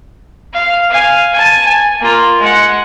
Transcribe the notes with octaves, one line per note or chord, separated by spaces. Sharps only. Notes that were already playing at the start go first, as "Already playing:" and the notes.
F5
F5 G#5
G#5 A5
G#5
A#3 F4
G#3 F#5